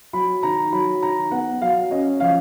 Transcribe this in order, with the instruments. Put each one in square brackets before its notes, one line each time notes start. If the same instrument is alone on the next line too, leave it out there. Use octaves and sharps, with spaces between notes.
[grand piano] F#3 B5
D#3 A#5
F#3 B5
D#3 A#5
B3 F#5
F#3 F5
C#4 D#5
F3 F5